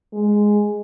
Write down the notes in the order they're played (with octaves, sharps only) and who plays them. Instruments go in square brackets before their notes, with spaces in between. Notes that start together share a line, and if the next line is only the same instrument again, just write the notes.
[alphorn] G#3